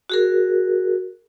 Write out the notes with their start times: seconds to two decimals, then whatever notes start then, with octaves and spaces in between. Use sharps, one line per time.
0.10 F#4 G#4 A#4